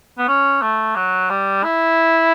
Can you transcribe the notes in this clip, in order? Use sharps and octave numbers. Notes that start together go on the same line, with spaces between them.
B3
C#4
A3
F#3
G3
E4